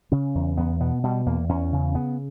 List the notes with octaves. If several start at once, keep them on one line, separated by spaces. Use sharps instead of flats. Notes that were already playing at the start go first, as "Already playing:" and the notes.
C#3 C#4
E2
E2 B3
B2 B3
B2 G3
E2 A#3
E2 C#4
C#3
C#3 B3